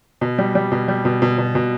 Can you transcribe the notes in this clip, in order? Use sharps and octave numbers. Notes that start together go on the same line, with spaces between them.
B2
G3
G3
B2
G3
B2
B2
B2
B2